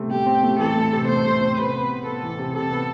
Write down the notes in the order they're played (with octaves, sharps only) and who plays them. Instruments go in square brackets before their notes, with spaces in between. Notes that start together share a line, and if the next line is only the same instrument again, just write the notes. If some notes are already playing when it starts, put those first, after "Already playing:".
Already playing: [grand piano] C3 A3 C4
[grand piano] A3 [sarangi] G4
[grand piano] C4
A3
[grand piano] E3 [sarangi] A4
[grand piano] A3
C3
[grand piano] A3 [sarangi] C5
[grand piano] A3
C4
[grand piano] C3 [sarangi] B4
[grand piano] B3
B3
[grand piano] B3 [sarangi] A4
[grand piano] E3
C3
[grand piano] C3 [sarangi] A4
[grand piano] B3